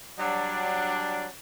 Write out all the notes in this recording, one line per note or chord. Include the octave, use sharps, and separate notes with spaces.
F#3 G3 D4